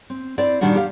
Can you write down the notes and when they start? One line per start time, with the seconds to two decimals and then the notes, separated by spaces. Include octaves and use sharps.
0.10 C4
0.38 C4 E4 D5
0.61 A#2 D#3 G3 A#3 D4 F#4
0.75 G4 F5